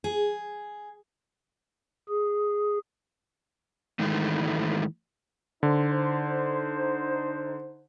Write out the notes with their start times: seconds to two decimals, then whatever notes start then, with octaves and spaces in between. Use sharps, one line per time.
0.04 G#4
2.08 G#4
3.99 G#2 D#3 E3 G#3 A3
5.63 D3 D#4 C5